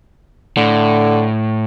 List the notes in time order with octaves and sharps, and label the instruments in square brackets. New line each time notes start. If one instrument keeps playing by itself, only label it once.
[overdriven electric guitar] A2 [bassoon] D3